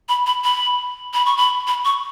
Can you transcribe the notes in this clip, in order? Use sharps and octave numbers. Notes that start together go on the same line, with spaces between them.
B5
B5
B5
B5
C#6
B5
B5
C#6